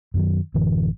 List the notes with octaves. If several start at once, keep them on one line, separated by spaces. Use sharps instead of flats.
F#2 D#3 F#3
A1 F#2 D3 E3